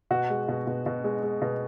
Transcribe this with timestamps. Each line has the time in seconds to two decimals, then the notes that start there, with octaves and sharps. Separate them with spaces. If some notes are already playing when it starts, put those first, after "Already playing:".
0.11 B2 F#4
0.30 G#3
0.49 B2
0.67 B2
0.86 B2
1.04 G#3
1.23 G#3
1.42 B2